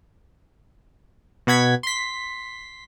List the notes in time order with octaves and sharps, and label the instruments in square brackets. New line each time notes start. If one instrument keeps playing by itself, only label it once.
[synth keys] B2 F#5 G#6 B6
C6 B6